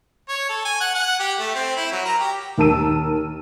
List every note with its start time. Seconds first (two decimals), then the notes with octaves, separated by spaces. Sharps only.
0.28 C#5
0.49 A4
0.65 G#5
0.80 F#5
0.94 F#5
1.19 G4
1.39 A3
1.54 C4
1.76 E4
1.92 F#3
2.05 A#4
2.20 G4
2.58 D#2 A#4 A5 E6 D#7